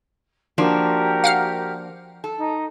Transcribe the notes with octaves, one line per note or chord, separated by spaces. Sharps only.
F3 A#3 D4 F#4 G4 A#4
F5 F#5 F6
A4
D#4